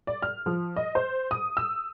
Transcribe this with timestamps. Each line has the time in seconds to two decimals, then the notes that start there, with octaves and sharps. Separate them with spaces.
0.07 D5
0.22 F6
0.46 F3
0.76 D#5
0.95 C5
1.31 D#6
1.57 E6